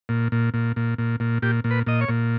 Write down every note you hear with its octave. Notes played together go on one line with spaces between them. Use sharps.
A#2
A#2
A#2
A#2
A#2
A#2
A#2 G4
A#2
B4
A#2 D#5
C#5
A#2